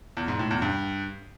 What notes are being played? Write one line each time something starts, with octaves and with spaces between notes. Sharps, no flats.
E2
G#2
A2
E2
G2